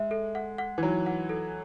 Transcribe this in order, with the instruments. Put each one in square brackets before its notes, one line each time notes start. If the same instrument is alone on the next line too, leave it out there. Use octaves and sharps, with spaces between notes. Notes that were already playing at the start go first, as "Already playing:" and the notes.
Already playing: [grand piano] G#3 [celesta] E5
[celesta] A4
F#5
F#5
[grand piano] E3
[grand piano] F#3 [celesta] D#4
[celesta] F#5
A4